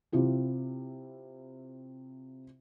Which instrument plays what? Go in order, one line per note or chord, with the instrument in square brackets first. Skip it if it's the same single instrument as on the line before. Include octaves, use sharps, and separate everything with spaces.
[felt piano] C3 E4 F4 G4